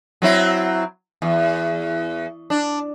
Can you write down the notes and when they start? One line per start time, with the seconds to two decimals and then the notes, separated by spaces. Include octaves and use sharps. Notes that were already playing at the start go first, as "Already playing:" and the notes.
0.22 F#3 C4 E4
1.22 E2
2.50 D4